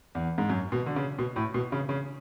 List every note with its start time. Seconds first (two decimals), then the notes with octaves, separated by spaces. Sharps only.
0.15 E2
0.38 G#2
0.50 F#2
0.72 B2
0.86 D3
0.96 C#3
1.19 B2
1.36 A2
1.54 B2
1.72 C#3
1.89 C#3